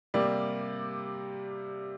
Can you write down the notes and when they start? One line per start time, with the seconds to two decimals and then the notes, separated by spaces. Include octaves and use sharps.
0.14 C3 G3 A#3 D5